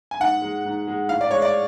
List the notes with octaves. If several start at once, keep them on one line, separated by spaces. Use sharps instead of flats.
G#5
G#2 F#5
G#3
G#2
G#3
A2 F5
D5
G#3 C#5
D5